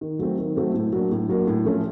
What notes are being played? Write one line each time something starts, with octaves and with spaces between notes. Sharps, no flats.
D#3
F#3 A3 C4
D#3
F#3 A3 C4
A2
F#3 A#3 D4
A2
F#3 A#3 D4
A2
F3 A3 C#4